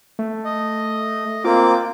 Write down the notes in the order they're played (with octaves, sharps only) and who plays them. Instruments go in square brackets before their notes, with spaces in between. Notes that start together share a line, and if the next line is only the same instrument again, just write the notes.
[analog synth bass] A3
[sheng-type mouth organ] D#5
[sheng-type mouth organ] A#3 C4 D6 [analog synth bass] F4